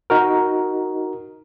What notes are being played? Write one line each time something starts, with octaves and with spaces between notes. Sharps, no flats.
D#4 F#4 A#4